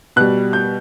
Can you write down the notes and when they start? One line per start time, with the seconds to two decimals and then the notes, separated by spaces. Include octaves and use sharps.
0.16 B2 G3 F#6
0.53 G6